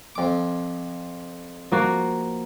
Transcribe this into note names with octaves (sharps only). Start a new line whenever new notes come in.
F2 D6
F3 A#3 F#4